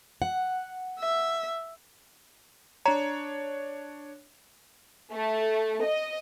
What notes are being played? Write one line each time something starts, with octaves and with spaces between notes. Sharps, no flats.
F#5
E5
D4 C#5 A#5
A3
D#5